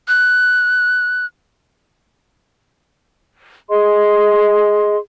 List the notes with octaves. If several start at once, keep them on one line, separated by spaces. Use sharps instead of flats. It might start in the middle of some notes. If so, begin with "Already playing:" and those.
F#6
G#4 D#5 C6